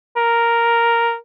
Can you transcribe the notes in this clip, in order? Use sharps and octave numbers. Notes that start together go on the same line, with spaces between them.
A#4